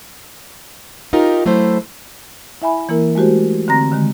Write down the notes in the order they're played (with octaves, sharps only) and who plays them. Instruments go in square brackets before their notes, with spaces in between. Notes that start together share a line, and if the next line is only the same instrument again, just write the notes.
[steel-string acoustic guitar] D#4 F4 G4 A#4
F#3 A3 E4 C5
[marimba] E4 E5 G#5 B5
E3 A#3 E4 A#4
G#3 A3 F#4 G4 C5
D3 C4 A#5 A#6
D3 D#3 G#3